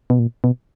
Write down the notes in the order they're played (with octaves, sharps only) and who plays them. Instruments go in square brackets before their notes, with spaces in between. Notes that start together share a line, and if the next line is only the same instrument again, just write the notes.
[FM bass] B2
A#2
B2